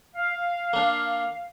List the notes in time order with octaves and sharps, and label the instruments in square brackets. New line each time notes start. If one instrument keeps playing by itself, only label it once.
[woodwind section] F5
[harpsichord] A#3 D4